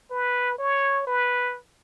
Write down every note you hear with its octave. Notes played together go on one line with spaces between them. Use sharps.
B4
C#5
B4